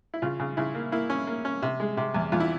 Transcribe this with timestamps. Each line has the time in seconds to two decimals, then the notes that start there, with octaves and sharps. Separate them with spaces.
0.14 E4
0.22 C#3 F4
0.40 C#3
0.57 C#3 E4
0.75 A#3
0.92 A#3 E4
1.10 C#4
1.27 A#3
1.45 C#4
1.62 C3
1.80 G#3
1.97 C3
2.14 E2
2.32 E2 F4
2.40 E4